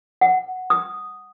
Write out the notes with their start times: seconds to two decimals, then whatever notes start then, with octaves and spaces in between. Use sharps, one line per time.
0.21 F#5
0.70 D#6